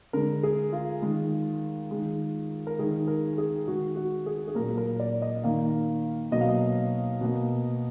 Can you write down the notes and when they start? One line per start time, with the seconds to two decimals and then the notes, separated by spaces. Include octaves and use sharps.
0.13 D3 G#3 A#4
0.43 G#4
0.73 F4
1.02 D#3 G#3
1.91 D#3 G#3
2.67 A#4
2.79 D#3 G#3 G#4
3.08 A#4
3.38 G#4
3.68 D#3 G#3 F#4
3.96 F#4
4.26 G#4
4.48 G#4
4.55 A#2 F#3 A#3 A#4
4.77 A#4
4.99 D5
5.22 D#5
5.44 D#3 A#3 F5
6.31 B2 F#3 A#3 D#5
6.41 F5
6.49 D#5
7.21 B2 A#3